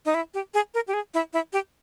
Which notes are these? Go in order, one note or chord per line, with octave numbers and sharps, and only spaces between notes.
D#4
E4
G4
G#4
A#4
G4
G#4
E4
E4
G4